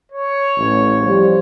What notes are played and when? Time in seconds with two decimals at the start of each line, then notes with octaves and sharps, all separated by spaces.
0.12 C#5
0.57 A1
1.02 F3 G3 C5